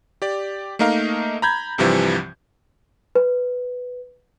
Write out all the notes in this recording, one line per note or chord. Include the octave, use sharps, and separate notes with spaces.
G4 D5
A3 A#3 D#4 A#4 F5
A#5 B5 G6 G#6
C2 G2 C3 E3 F3 G3
B4